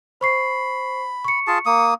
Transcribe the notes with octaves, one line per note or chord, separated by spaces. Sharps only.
C5 B5 C#6 C7
C#6 C#7
F4 G#4 A5
A#3 D#6